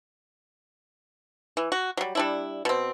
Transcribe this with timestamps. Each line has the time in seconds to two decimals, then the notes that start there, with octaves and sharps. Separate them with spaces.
1.57 E3
1.72 F#4
1.97 F#3 G3
2.15 G3 D4 E4
2.65 B2 C4